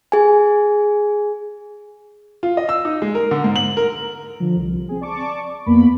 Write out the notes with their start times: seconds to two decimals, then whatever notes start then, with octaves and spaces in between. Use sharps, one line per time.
0.12 G#4 G#5
2.43 F4
2.57 D#5
2.69 E6
2.85 D#4
3.02 G#3
3.15 A#4
3.31 D3
3.44 G#2
3.56 F#7
3.77 A#4
4.40 D3 F3
4.56 C2
4.89 C4 G#4
5.01 D5 A5 C#6 D6
5.66 F2 A#3 B3 B5